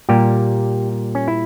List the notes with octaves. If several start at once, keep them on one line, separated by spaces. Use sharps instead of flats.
A#2 G3 A#3 G4
C#4
E4